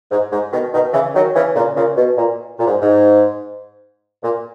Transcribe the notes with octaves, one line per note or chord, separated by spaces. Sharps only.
G#2
G#2
B2 D#3
B2 D#3
C#3 E3
D#3 F#3
C#3 E3
A#2 C#3
A#2 C#3
B2
A#2
A#2
G#2
G#2
A#2